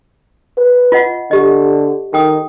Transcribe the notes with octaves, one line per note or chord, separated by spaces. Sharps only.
B4
F4 D#5 F#5
D3 G4 D#5
D#3 A4 G5 D#6